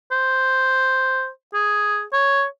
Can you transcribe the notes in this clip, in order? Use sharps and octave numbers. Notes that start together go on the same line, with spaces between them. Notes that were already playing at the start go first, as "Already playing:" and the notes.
C5
G#4
C#5